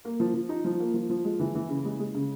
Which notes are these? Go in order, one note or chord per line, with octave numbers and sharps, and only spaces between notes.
A#3
F3
F3
D#4
F3
A#3
F3
F3
G#3
E3
E3
C#3
G#3
G#3
C#3